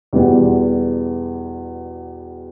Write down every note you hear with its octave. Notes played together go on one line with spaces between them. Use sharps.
E2 B2 G3 B3 E4